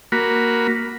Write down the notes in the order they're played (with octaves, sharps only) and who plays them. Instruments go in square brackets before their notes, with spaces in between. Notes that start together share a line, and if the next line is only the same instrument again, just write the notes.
[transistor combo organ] A#3 F#4 B5